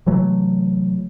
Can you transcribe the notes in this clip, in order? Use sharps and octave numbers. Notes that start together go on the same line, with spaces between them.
C3 E3 F#3 A3